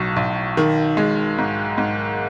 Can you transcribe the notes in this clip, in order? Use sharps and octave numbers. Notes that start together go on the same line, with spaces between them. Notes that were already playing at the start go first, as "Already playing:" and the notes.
Already playing: B1 A2 F#3
B1
D#3
G#3
G#2
G#2